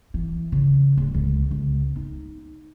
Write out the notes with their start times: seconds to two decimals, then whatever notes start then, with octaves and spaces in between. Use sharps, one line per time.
0.14 E3
0.52 C#3
0.97 D1
1.14 C#2
1.51 C#2
1.96 D#4